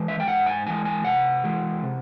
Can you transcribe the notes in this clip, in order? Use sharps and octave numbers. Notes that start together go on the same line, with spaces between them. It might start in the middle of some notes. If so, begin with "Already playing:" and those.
Already playing: E3 G#3
E5
G5
G#2 F#5
G#5
E3 G#3 G#5
G#5
C3 F#5
E3 G#3
C3